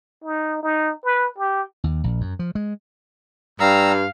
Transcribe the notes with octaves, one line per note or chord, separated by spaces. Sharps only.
D#4
D#4
B4
G4
D#2
A#1
F#2
F3
G#3
G2 G3 F5 A#5 E6